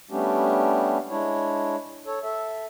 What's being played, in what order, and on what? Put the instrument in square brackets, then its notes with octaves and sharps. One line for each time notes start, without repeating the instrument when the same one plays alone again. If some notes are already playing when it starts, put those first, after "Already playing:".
[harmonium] G3 A3 B3 C#4 D4 G4
G#3 D4 E4 C#5
A4 C#5
A4 E5